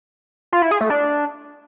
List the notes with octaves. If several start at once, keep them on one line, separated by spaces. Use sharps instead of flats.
F4
E4
G#4
A3
D4